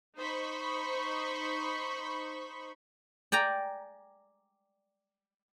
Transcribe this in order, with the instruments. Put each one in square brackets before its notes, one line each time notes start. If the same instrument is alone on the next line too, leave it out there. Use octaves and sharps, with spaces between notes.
[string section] D#4 C5 B5 C#6
[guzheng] D5 G5 G#5 A#5